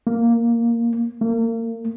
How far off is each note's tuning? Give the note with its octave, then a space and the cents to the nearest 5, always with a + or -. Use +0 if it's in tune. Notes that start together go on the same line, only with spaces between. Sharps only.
A#3 +0
A#3 -35